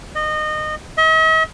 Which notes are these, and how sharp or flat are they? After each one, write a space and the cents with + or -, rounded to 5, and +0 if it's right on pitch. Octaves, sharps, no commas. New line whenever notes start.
D#5 -25
D#5 +45